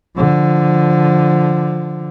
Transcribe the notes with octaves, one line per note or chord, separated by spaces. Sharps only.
D3 F3